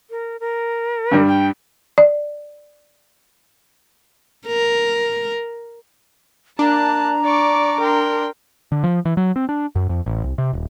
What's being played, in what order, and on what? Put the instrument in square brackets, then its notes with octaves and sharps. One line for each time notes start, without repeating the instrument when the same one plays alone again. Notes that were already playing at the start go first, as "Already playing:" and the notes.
[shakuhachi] A#4
A#4
[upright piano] G2 G3
[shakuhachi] G5
[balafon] D5
[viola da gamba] A#4
[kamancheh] A#3 F#6 [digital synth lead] D4 [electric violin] A5 [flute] A#5
[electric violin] D5 D6 [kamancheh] C#6
[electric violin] A#4 [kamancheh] G5 C6
[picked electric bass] D3
F3
E3
F#3
C4
D4
F#2
F2
A1
C2
C3
D#1